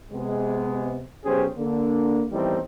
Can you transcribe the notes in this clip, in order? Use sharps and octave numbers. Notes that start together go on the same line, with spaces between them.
C3 G#3 B3
B1 C#4 G4 G#4 C5
D3 A#3
E2 A2 D#3 G3 C4 D#4